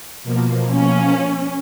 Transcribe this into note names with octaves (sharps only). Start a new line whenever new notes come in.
B2 F3 A#3
C#4